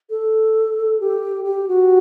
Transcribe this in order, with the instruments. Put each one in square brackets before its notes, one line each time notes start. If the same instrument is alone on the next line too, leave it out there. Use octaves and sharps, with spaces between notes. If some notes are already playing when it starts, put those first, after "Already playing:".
[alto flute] A4
G4
G4
F#4